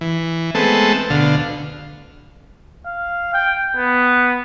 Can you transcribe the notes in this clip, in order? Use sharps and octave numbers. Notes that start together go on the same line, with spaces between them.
E3
G#3 A3 B3 C4 A4
D2 B2 D3 F5
F5
G5
B3